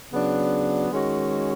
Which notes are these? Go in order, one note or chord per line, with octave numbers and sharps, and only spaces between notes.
C#3 F#3 B3 D4
D#3 G#3 C#4 F#4